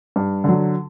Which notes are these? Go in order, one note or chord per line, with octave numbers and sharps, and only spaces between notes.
G2
D3 F#3